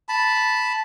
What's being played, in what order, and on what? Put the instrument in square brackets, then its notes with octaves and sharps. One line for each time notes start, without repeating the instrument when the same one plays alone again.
[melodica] A5 B5